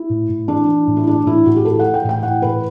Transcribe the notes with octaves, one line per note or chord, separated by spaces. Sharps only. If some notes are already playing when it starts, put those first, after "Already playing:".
Already playing: E4
A2
A2
E3 D4
E3
A2
E4
E3 D4
A2 E4
A2 F#4
G4
E3 A4
F#5
E3
G5
A2
G5
E3 F#5
A2 B4